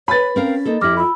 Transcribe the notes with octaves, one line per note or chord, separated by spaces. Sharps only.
B4 C#5 G#5 B5 A6
C4 C#4 A#4 F5
A#3 D#4 A4
F2 E4 G4 D6 F6 A#6
F4 B5 E6